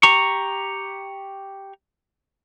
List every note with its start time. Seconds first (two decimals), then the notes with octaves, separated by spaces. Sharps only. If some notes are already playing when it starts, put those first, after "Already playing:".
0.03 G4 A#5 C#6